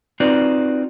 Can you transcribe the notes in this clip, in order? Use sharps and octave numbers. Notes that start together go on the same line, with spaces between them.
C4 D#4 F4 F#4 B4 D5